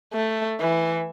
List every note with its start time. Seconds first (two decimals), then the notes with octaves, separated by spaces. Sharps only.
0.13 A3
0.60 E3